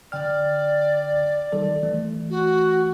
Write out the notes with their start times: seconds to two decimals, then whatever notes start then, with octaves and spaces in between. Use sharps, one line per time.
0.12 D3 D5 G5 F6
1.52 D#3 G3 A4
1.83 E3 A3
2.30 F#4